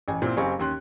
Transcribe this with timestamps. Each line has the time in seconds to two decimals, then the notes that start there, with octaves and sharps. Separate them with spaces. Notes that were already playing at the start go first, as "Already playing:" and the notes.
0.08 A1 G#5
0.22 A#2 C4 E4
0.37 F#1 C4 G4 F5 G#5 C#6
0.59 D#2 C#4 C6 F#6